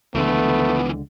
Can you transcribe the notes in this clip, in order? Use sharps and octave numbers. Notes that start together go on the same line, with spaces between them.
C#2 D3 E3 F3 A3 B3